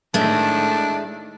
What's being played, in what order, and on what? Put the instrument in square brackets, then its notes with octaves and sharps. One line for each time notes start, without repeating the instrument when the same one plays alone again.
[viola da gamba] A2 D#3 [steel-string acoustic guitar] G#3 A3 [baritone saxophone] D4